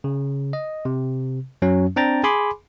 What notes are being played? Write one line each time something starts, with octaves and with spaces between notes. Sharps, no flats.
C#3
D#5
C3
F#2 F#3 C#4
C4 D4 G5 A#5 A6
G#4 G#5 B5 C6 D6